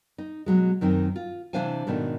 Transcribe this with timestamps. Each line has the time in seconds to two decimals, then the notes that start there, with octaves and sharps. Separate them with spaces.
0.18 D#4
0.46 B2 F#3 G#3
0.81 F#2 D#3 C4 D#4
1.16 F4
1.53 C3 E3 D4 C5 F5 G#5
1.87 G#2 B2 D#3 A3 D4